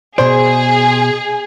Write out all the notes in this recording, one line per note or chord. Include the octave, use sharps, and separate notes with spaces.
B2 G#4 C5 D5